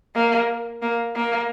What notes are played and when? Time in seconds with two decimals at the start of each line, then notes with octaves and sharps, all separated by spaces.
0.15 A#3
0.83 A#3
1.16 A#3